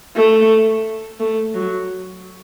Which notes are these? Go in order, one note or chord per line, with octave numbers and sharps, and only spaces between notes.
A3
A3
F#3